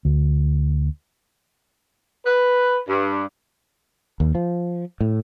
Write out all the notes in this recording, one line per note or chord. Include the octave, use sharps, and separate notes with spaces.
D2
B4
G2
D#2
F3
A2